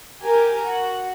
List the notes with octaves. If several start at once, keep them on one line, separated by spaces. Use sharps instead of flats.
G4 A#4 G#5
F#4